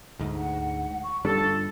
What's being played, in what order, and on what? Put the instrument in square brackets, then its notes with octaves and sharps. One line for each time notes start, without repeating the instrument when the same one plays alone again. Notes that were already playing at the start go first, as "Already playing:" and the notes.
[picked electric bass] D2 G#2
[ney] F#5
C#6
[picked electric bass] G1 G3 D4 [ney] F4 [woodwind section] A4